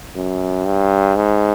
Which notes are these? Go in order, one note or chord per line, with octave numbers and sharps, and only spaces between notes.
F#2
G2
G#2